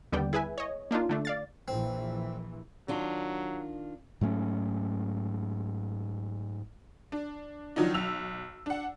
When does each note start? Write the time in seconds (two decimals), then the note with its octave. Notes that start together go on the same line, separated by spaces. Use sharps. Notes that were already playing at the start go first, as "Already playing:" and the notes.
0.12 D#2 D3 G3 B3 D5 G5
0.33 E4 G#4 B4 E5 G#5
0.58 C#5 D#5
0.91 A#3 D4 D#4 F4
1.09 D3 A3 D4
1.25 D5 F5 A6
1.68 A#1 A#2 E3 C4
2.88 D#3 F#3 D4 F4
4.21 G#2 F#3 A3 C#4
7.12 D4
7.76 D#3 F3 F#3 D4 D#4
7.94 B1 E6 F7
8.66 D4 F#5